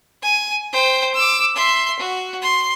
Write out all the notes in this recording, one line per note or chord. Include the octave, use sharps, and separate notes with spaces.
G#5
C5 G5
D6 E6
E5 C6
F#4
C6